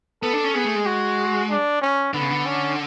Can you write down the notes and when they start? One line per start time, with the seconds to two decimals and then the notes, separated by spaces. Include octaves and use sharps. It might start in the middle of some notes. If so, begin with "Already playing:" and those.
0.22 B3 A4
0.33 D4
0.44 C#4
0.54 B3 G#4
0.65 A3
0.76 G#3
0.86 F#4
1.50 D4
1.82 C#4
2.14 D3 B3
2.21 C#3
2.30 D3
2.46 C#4